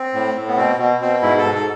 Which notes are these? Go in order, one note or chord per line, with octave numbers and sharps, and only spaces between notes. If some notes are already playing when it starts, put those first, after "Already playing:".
Already playing: C4
A2
A2
B3
B2 C4
B2
B2 C4
G#2 E4
A4
G#2
A4